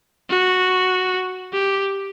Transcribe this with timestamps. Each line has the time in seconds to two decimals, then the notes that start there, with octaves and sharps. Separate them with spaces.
0.30 F#4
1.53 G4